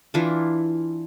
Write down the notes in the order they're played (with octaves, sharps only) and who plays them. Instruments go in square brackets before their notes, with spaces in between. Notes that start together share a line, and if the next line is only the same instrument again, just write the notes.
[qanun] E3 D4 E4 F4